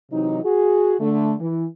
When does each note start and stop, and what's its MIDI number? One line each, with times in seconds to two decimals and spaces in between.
0.12 0.40 48
0.12 0.40 52
0.12 0.40 54
0.12 0.40 63
0.44 0.95 66
0.44 0.95 68
1.00 1.34 50
1.00 1.34 57
1.40 1.66 52